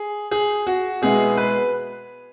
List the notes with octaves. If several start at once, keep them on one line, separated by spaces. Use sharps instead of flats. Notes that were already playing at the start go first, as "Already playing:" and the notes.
Already playing: G#4
G#4
F#4
B2 G#3 B3 E4 G#4
B4